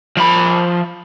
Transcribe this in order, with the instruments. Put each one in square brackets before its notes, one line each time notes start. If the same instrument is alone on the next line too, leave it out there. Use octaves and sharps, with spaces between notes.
[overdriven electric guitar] F3 B5